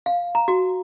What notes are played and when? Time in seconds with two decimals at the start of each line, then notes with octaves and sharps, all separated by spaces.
0.06 F5
0.35 A#5
0.48 F#4